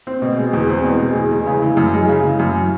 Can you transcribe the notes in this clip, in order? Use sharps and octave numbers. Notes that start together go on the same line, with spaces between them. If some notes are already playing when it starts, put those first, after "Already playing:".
C4
B2
G#3
E2
C4
B2
G#3
E2
G#3
C#3
E3
F#2
G#3
C#3
E3
F#2